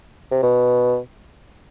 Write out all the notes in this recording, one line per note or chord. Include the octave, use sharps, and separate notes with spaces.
C3
B2